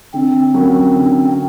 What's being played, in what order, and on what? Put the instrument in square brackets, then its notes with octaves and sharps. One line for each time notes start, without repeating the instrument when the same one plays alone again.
[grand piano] D3 [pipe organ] C4
[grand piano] F#3 A#3 C#4 F#4
D3